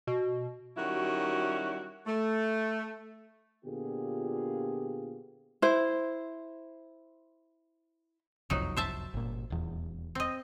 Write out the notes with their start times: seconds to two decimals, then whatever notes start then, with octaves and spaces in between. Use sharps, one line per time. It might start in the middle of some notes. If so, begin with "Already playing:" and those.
0.07 B2
0.77 D#3 F#3 G3 C#4 E4 F#4
2.06 A3
3.64 A#2 D3 B3 F4 G4 G#4
5.62 E4 C5
8.50 F#1 C2 F2 F#3 D#4
8.76 C5 E5 A5
9.14 G1 A#2
9.50 D#1 E2
10.15 C4 D#5